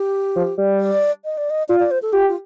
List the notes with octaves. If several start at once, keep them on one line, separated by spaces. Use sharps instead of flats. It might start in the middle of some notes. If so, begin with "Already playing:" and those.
Already playing: G4
F3
G3
D5
D#5
D5
D#5
F4 D5
D5
C5
A4
F4 G4
F4